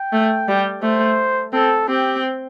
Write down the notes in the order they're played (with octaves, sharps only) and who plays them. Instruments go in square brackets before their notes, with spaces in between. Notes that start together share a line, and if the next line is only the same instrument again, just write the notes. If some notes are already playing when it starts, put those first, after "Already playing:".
Already playing: [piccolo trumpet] G5
[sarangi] A3
G3
[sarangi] A3 [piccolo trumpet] C5
[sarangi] C4 [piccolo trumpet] A4
[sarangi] C4 [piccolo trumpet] G4